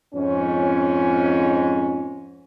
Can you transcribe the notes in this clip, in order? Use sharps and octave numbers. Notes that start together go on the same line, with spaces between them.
F2 G#2 C#4